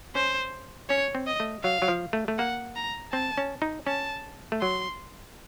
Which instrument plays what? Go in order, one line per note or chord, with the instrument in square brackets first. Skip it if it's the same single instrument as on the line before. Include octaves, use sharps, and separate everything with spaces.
[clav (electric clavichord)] C#4 [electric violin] C5
[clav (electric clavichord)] C#4 [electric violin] C#5
[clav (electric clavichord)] C4
[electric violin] D#5
[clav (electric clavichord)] A3
[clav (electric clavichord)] F#3 [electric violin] F5
[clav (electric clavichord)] F#3
F3
A3
A3
[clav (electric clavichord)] A#3 [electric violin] F#5
[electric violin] A#5
[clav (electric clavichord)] C4 [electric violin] A5
[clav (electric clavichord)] C#4
D#4
[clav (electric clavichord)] C#4 [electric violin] A5
[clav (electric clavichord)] A3
[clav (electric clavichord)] F#3 [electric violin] C6